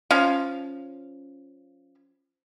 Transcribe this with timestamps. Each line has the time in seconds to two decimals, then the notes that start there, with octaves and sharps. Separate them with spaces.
0.11 F3 C#4 F5